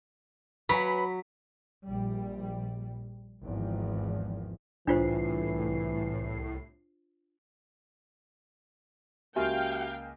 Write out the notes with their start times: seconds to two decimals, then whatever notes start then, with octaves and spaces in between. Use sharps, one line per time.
0.69 F#3 B4 C#5 G#5 B5 B6
1.87 A#1 G3
3.44 G#1 E2 F3
4.87 C2 A2 E3 D4 F4 C5 C7
9.36 C#2 A#3 F#4 G4 E5 F5 G5 G#5